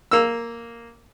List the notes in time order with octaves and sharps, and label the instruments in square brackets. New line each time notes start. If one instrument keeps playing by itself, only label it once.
[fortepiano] A#3 E6